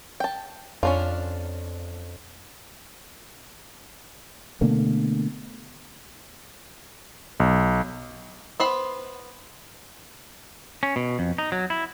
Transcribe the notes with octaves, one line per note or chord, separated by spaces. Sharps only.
G5 A5
F2 C#4 D4 F4
B2 D3 A3 A#3
B1
B3 C5 B5
C#4
B2
F2
D#4
F#3
E4